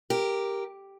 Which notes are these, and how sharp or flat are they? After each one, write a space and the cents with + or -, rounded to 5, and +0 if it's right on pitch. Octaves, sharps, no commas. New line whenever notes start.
G4 +0 A#4 +0